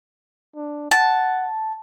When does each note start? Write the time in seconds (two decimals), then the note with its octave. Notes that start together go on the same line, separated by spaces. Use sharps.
0.55 D4
0.91 F#5 A5